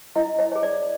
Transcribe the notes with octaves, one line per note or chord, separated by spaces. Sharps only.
E4 D#5 F5
C#5 D#5
G#4 C#5
D5